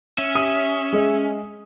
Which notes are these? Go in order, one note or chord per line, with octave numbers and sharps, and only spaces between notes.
C#4 E5
G4 D#6 D#7
G#3 G#4 D#5